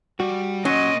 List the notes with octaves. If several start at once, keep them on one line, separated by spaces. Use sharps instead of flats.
G3 F#4
A#2 F#3 C#4 D#5 C6